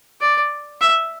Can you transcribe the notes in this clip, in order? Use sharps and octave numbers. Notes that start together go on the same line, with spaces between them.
D5
E5